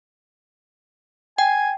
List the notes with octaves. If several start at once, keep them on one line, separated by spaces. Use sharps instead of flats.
G5 G#5